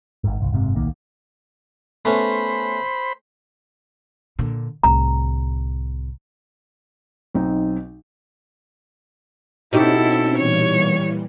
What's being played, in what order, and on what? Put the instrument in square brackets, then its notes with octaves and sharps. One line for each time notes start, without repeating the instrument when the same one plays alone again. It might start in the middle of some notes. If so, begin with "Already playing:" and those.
[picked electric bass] G#1 G#2
G1 C2
F#1 G#2 C3
D1 B1 D#3 A#3
[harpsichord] A3 B3 C#4 [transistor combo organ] C5 B5
[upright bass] A#2 D3
[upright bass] C2 A2 [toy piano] A#5
[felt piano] B1 C4 D#4
[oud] B2 D#4 G4 [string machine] C4 C#4 C5 [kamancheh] E4 A4
[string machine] A#2 E3 G3 [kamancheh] C#5